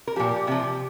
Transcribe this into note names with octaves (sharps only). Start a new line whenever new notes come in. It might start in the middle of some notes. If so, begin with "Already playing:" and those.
A#4
A#2 F3 G4
C3 F3 G4